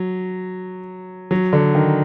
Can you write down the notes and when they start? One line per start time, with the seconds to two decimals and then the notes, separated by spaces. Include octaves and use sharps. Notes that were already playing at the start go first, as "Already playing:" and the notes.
Already playing: F#3
1.31 F#3
1.53 D3
1.75 D#3